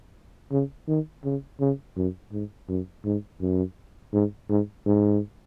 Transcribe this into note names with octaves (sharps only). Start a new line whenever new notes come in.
C#3
D#3
C#3
C#3
F#2
G#2
F#2
G#2
F#2
G#2
G#2
G#2